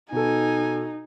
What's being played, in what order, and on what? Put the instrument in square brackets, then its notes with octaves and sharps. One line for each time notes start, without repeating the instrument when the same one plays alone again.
[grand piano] B2 A4 [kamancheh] D#4 [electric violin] G#5